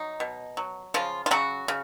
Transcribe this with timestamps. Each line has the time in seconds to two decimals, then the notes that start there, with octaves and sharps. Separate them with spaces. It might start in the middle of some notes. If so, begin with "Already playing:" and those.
Already playing: F#3 D#4
0.20 B2
0.57 F#3
0.94 C#3 F3 F4
1.26 F4
1.31 C#3 F#3 F#4
1.68 C#3